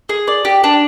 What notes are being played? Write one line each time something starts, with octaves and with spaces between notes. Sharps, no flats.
G#4
D5
G4
D4